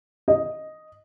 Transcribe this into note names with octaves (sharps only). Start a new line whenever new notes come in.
D#5